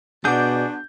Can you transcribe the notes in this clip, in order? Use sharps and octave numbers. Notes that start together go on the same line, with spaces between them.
B2 B3 D4 F#4 G#4 D5 G6